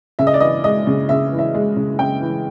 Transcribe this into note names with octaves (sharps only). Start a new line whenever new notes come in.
C#3 E5
D#5
D5
E3 D#5
G#3 D#5
C#3
C#3 E5
E3
E5
G#3
C#3
C#3 G5
E3